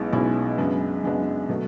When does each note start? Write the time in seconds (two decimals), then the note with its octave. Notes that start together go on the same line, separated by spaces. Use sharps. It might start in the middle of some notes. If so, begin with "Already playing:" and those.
Already playing: B1 B2 G#3 C#4 E4
0.13 B1 B2 G#3 C#4 E4
0.58 F#2 C#3 G#3 B3 D4
1.03 F#2 C#3 G#3 B3 D4
1.49 B2 F#3 A3